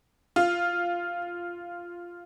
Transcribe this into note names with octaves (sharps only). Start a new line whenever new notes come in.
F4